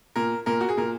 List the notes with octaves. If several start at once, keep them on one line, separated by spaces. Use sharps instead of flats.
A#2 A#4
A#2 A#4
F#4
G#4
A#2 A#4